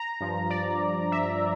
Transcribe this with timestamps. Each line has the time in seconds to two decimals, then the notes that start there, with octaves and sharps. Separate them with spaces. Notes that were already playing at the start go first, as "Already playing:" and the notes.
Already playing: A#5
0.21 G2 F3
0.50 D5
1.12 E5